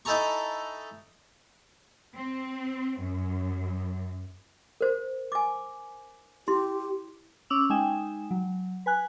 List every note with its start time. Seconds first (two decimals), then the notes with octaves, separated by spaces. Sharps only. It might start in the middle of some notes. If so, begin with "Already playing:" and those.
0.05 D#4 E4 A4 G#5 A#5 C#6
2.16 C4
3.01 F#2
4.81 A#4 C5
5.32 G#5 D6
6.48 E4 G4 C6
7.50 C#4 D6 E6 F7 F#7
7.70 G#3 D#4 G5 G#5 E7
8.31 F#3
8.86 B4 G#5 F#6